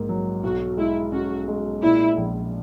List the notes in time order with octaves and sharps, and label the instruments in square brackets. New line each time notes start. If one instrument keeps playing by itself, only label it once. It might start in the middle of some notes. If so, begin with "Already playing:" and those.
Already playing: [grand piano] A#1 G#2 A#3
F#3
[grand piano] B1 [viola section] F#4
[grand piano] G#3 [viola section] E4
[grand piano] C#4 [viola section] F#4
[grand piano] G#3
[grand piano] A#2 [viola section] E4
[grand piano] A#1